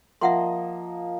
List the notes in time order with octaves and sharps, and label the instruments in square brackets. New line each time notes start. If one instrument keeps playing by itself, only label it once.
[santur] F3 A#3 D#5 [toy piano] E5 F#5 C6